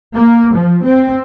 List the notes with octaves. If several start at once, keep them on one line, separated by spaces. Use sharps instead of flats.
A#3
F3
C4